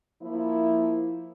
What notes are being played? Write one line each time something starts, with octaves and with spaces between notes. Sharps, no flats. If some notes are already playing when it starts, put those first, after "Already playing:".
F3 A#3 E4